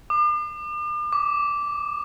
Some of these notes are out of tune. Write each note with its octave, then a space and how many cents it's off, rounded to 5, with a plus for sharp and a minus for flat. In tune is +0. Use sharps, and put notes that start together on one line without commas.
D6 +40
D6 -10